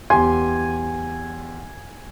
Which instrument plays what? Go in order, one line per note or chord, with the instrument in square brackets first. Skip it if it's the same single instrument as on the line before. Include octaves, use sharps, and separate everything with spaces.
[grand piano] E2 G4 C6 [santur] G#5